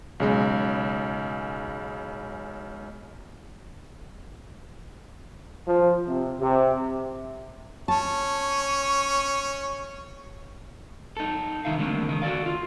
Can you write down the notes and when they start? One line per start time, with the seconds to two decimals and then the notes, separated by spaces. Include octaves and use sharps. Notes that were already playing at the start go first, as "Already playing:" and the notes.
0.20 B1 C#3 G#3
5.67 F3
6.08 C3
6.40 C3
7.88 C#4 A5 C#6
11.17 D#4 A4
11.65 C2 F#2 D#3 D#4 E5 F5
11.78 D3 G3 A3 A#3 C4
12.09 C#2 D#3 D#4
12.22 F#4 A4 D5 F5
12.46 F4